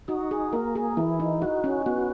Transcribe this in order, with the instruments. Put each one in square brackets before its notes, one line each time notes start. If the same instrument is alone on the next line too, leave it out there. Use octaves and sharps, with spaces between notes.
[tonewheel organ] D#4 [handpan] F#4
[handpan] G#4
[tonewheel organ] A#3 [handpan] A#4
[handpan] G#4
[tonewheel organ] E3 [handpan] E4
[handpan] D#4
[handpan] D#4 [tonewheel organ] F#4
[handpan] C#4
[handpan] B3 [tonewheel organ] F#4